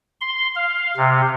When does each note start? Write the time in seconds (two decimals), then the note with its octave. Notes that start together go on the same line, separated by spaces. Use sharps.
0.21 C6
0.55 F5
0.97 C3